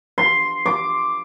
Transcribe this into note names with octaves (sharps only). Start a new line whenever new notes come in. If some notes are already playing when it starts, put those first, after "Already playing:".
C6
D6